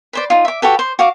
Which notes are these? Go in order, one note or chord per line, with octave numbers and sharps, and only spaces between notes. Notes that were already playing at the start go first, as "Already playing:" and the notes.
B4 C5 D5
D#4 F4
E5 D6
F#4 G4 A4 B4
C5
F#4 F5 D6